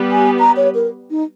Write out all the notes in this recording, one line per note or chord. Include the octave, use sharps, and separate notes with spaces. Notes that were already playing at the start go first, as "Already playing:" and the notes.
Already playing: G3 B3 G4 B4
G#5
A#5
C#5
A#4
D#4